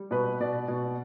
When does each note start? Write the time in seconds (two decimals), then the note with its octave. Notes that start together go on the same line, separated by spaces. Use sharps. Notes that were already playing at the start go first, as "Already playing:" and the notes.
Already playing: G3
0.11 B2 B4
0.41 B2 D5
0.68 B2